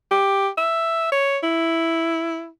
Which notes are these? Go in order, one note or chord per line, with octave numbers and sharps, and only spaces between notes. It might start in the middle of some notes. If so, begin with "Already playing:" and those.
G4
E5
C#5
E4